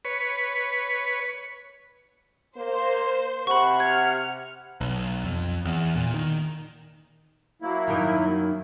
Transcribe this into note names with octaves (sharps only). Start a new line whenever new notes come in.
B4 C#5
A#3 C5
C3 F#5 B5 C#6
F6 G#6
B1
F2
E2
A#2
D#3
F#3 A#3 E4
F#2 D#3 D#4